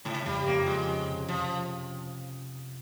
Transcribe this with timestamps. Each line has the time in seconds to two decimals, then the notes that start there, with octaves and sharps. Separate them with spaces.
0.04 G#2 C#3
0.26 F2 G3
0.46 F2 A#3
0.66 G#3 F4
0.88 C#4
1.09 C3
1.29 F2 F3